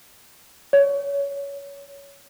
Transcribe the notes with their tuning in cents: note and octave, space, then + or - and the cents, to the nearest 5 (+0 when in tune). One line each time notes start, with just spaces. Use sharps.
C#5 +20